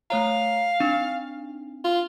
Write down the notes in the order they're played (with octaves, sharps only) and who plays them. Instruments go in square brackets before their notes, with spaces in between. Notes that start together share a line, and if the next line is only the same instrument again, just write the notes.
[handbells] A3 C#5 A#5 [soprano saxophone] F5
[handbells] C4 D4 D#4
[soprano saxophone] F4